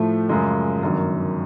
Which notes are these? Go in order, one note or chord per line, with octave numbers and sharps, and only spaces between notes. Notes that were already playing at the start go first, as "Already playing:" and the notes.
Already playing: A2 F3 A3
F#2 C#3 F3 G#3
G1 F#2 D#3 F#3